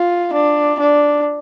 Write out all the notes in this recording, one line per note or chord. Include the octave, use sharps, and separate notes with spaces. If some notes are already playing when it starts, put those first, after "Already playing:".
Already playing: F4
D4
D4